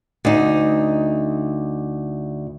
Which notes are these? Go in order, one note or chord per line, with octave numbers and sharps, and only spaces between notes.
D2 D#4